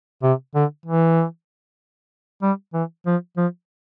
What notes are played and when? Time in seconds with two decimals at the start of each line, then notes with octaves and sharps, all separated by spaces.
0.23 C3
0.55 D3
0.86 E3
2.42 G3
2.74 E3
3.06 F3
3.37 F3